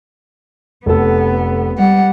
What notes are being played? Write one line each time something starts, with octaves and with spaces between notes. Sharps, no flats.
F1 B3 A4
G3 F#5